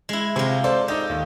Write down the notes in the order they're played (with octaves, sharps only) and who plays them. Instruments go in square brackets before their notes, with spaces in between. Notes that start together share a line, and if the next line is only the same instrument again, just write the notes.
[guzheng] G#3 E4
[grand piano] C3 [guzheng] G#3 F4
[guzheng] A4 [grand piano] C5 D5
[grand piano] D#4 D#5 [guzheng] G4
[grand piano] D#2